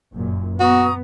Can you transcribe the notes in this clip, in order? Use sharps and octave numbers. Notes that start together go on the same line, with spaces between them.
F#1 F#2 A#2
B3 F#4 A#5 C#6 D#6